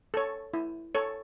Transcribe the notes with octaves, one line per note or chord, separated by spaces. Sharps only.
A4 C#5
E4
A4 C#5